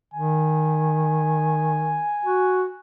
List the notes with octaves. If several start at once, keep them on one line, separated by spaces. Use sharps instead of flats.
D#3 G#5
F#4